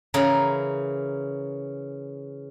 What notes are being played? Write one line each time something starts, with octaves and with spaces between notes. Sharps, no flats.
C#3 E3 A#4 A#5 B5